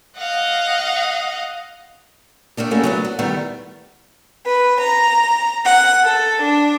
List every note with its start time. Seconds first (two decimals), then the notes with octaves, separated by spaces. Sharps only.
0.17 D#5 F5 F#5
2.57 A3 A#3 D4 G4
2.71 A3 A#3 C#4 E4 F#4 G4
2.83 F#3 B3 D4
3.05 F#4
3.19 G2 D#3 G3 A3 B3
4.46 B4
4.79 A#5
5.66 F#5
6.04 A4
6.42 D4